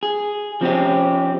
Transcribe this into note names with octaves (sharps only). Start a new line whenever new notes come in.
G#4
F3 C4 C#4 G4